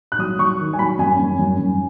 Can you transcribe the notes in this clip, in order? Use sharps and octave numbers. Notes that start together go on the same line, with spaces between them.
F#6
F#3 D#6
F#3 C#6
D#3
G#5
F#3 B5
F#2 G#5
F#2
F#2
F#2